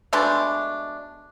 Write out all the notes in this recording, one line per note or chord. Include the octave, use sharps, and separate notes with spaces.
B2 G#3 A3 D4